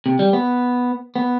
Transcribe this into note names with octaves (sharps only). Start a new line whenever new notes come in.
C3
G3
B3
B3